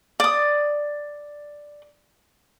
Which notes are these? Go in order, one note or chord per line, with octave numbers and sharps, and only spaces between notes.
D5 D#6